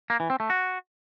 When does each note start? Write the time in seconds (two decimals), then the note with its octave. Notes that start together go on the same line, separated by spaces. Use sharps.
0.10 A#3
0.20 E3
0.30 C4
0.40 A3
0.50 F#4